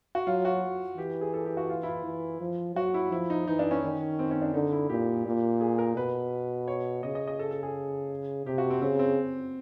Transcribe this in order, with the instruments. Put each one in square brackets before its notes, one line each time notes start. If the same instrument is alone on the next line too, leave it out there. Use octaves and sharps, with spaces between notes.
[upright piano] F#4
[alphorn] F#3 [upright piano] F4
[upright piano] F#4
[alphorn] E3 [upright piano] G4
[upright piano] G#4
A4
G4
F#4
F4
E4
F4
[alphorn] E3
F3
[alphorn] F#3 [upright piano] F#4
[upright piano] E4
[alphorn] F3 [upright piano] E4
[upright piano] D#4
[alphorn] E3 [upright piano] D#4
[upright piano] D4
C#4
[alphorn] D#3
[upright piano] C4
C#4
D4
[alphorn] D3 [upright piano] D#4
[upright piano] E4
[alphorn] A#2 [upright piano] G4
[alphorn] A#2
[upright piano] G#4
A#4
[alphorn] B2 [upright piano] B4
[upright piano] C#5
[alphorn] C#3 [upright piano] D#5
[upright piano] D#5
D#5
A4
A4
G#4
[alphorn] C3 [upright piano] G4
[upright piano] F#4
C4
[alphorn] C#3 [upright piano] C4
[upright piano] C4